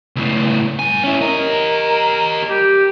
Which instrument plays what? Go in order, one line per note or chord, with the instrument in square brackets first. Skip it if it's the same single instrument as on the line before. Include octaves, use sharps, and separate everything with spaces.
[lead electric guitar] C#2 A2
G2 G#5
C#4 E4
[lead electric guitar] G4 D#5 [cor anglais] A#4
[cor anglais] G4